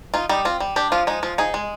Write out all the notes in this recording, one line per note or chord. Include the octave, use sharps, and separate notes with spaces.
D#4 F4
G3 D#4
C4 F4
G3
D4 G4
F3 F4
G#3 D#4
F3 F4
D#4 G#4
G#3